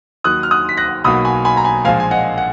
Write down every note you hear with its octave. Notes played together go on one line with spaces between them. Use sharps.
D#2 D#3 F#3 D#6 F#6
F6
D#6 F#6
B6
F#6 A#6
B1 B2 F#3 A#3 B5 D#6
G#5 B5
G#5 B5
A#5
G#5 B5
A#1 A#2 F3 G#3 F5 G#5
G#5
D#5 F#5
F#5